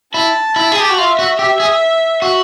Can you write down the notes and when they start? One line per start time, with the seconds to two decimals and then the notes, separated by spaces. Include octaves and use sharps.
0.14 E4 A5
0.56 E4
0.72 G#4
0.80 G4
0.89 F#4
0.97 F4 E5
1.19 F#4
1.39 G4
1.60 G#4
2.22 F#4